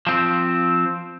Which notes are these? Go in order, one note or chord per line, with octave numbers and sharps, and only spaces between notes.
F3 C4